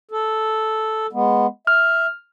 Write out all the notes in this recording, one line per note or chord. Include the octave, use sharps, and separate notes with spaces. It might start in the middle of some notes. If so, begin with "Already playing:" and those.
A4
G#3 B3
E5 F6